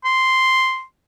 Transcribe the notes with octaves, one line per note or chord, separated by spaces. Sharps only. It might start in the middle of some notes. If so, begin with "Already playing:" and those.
C6